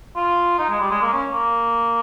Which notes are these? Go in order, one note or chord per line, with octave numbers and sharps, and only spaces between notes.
F4
D#4
G#3
G3
G#3
A#3
C#4
A#3